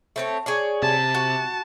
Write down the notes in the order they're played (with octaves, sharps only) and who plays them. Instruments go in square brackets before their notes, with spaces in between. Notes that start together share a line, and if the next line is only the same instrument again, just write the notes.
[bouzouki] A3 C4 C#5
G#4 C#5 D5
[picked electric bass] C3 [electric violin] A5
[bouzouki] F#4